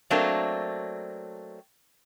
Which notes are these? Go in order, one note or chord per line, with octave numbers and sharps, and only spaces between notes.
F#3 A3 A#3 C4 D4